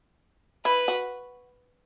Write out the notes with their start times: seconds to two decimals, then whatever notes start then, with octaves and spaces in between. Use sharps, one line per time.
0.65 E4 B4
0.88 F#4